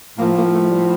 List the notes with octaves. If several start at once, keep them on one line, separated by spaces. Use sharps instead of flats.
A2 F3 A#3
A#3
A3
G3